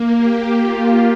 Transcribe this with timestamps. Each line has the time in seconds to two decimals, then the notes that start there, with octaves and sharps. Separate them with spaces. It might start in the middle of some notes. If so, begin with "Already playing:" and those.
Already playing: A#3
0.16 G4
0.60 F4